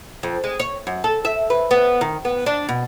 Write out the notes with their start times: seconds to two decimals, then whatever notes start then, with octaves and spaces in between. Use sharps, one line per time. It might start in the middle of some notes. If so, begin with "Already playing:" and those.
0.23 F2
0.44 G#3
0.60 C#5
0.87 F#2
1.04 A4
1.25 E5
1.50 B4
1.71 B3
2.01 D#3
2.25 B3
2.46 D4
2.69 B2